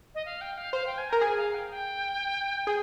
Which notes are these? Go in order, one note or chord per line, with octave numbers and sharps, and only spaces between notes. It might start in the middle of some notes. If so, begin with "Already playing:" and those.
D#5
F5
G5
F5
C5 F5
G5
G#5
A#4 A#5
G#4 G#5
F5
G5
G5
G#4